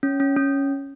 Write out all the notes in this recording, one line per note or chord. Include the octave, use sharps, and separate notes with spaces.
C#4
C#4
C#4